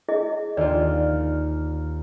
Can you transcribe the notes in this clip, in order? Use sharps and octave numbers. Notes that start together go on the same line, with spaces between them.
E4 G#4 D#5
D#2 F4 D5